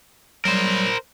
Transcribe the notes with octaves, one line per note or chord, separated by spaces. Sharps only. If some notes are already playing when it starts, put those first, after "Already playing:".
F#3 G3 A#4 C5